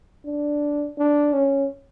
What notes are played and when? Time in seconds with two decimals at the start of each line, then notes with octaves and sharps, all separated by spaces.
0.25 D4
0.98 D4
1.34 C#4